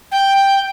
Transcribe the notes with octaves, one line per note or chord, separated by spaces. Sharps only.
G5